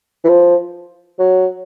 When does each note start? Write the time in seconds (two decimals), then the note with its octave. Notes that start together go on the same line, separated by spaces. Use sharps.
0.24 E3
0.28 F3
1.19 F#3